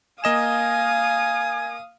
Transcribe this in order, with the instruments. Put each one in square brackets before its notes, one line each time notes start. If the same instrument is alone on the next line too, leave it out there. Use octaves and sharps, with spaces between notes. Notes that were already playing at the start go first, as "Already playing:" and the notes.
[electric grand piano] A#3 D#5 E7 [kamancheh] F5 D#6 [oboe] G#5